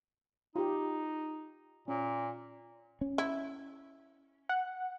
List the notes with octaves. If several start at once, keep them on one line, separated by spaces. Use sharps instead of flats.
D#4 F4 G4
A#2 C#4
C#4
E4
F#5